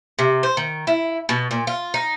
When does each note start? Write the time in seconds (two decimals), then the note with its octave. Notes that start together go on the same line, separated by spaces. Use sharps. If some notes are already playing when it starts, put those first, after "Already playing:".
0.19 C3
0.43 C5
0.57 D#3
0.87 E4
1.29 B2
1.51 A#2
1.67 F4
1.94 D#4